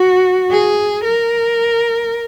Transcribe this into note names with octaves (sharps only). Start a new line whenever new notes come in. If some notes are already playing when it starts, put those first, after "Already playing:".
Already playing: F#4
G#4
A#4